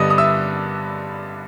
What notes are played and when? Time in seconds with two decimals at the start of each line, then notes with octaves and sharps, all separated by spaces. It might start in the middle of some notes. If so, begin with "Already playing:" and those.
Already playing: G2 D3 G3 B3 D#5 D#6
0.10 D#6
0.18 E5 E6